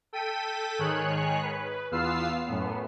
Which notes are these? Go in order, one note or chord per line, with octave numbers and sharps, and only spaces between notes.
A4 G5 B6 D#7
G#2 D#3 G#4 C#5 F#6
B4
E2 B3 F4 F5 E6 C7
F#2 A2 B3